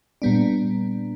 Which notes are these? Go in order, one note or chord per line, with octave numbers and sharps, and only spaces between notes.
A#2 G3 B3 D4